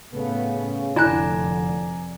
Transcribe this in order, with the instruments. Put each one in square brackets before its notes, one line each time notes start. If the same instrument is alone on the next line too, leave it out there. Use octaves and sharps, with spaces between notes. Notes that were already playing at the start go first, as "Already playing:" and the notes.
[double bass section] A2 A3 B3 [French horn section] C#3
[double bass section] F1 [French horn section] A2 D3 [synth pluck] E4 F#6 [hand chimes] D5 G#5 A#5